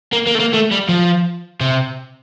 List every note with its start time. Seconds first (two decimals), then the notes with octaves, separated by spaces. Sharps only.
0.13 A#3
0.27 A#3
0.35 A3
0.39 A#3
0.53 A3
0.71 G3
0.89 F3
1.61 C3